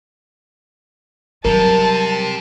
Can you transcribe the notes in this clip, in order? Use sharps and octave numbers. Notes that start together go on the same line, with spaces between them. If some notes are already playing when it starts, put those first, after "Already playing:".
C3 F#3 G3 A#4 A5